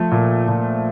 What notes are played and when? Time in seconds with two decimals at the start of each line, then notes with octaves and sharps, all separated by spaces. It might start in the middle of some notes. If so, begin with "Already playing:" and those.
Already playing: F3 A3
0.11 A#2
0.48 A#2